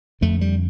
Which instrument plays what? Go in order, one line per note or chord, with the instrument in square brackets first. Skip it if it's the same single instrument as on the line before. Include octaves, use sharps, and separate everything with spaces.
[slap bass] F2 D3 A3
G3